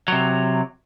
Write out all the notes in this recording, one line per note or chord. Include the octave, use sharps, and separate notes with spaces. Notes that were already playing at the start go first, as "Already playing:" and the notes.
C3 F#3